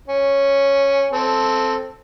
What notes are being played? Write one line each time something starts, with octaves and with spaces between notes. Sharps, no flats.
C#4
C4 A4